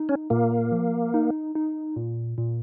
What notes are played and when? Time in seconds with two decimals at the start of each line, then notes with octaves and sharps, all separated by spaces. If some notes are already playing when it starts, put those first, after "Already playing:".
Already playing: D#4
0.09 C#4
0.30 A#2 A#3
0.72 F3
1.14 D#4
1.55 D#4
1.96 A#2
2.38 A#2